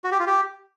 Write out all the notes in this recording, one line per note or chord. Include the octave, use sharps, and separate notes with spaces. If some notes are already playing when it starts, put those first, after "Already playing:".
F#4
G4
F4
G4